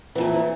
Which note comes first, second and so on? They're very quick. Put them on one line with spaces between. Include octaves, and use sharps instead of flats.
E3 F2 A#2